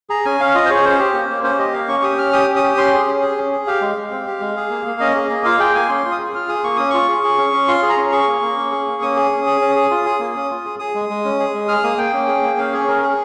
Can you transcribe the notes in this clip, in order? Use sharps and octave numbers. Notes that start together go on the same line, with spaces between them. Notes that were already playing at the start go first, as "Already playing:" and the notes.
G#4 A#5
C#4 G#5
C#4 F5
F4 D#5
C5
G#4 C#5
C#4 C5
G4
A#3
A#3
C#4 C5
G4 D#5
A#3 F5
C#4 C#6
G4 D#6
C#4 F6
G4 D#6
C#4
D#6
G4
C#4 C6
G#4
C#4
G#4
C#4
G#4
G4 F5
G#3
G#3
C4
G4
G#3
G#4
A#3
A#3
C#4 D#5
G#4
A#3
F4 F5
G#4 G5
A#3 G#5
C#4 C6
F4
D#6
G#4
F4 F6
G#4 D#6
A#3 C#6
C#4 D#6
F4 C#6
G#4
G#4
C#4
C#4
F4 C6
G#4
A#5
C#4
G#4 C#6
A#3
A#3
C#4
G#4
A#3
C#4 D#6
G#4
C#4
G#4
C#4
G#4
F4
G#4
A#3
C#4
F4
G#4
G#4 D#6
G#3
G#3
C#4
G#4
G#3
G#4 F6
A#3 D#6
A#3 G5
C#4
G#4
A#3
C#4 F5
G#4 C#5
C#4 A#4
G#4